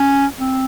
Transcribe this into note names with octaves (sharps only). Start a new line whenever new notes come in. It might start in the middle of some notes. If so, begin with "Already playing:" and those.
Already playing: C#4
C4